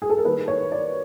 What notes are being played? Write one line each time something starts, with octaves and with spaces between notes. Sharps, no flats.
G#4
A4
A#4
D#3 G3 A#3 B4
C#5
D5